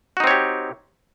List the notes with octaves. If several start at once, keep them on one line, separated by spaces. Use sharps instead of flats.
C4 D#4 F#4 G4 C#5